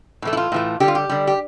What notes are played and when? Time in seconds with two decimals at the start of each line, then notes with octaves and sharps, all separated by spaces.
0.22 A2 E3 A3
0.33 E4
0.37 F4
0.52 A2 E3 A3
0.80 D3 G3 G4
0.88 F4
0.95 G4
1.10 D3 G3
1.27 G4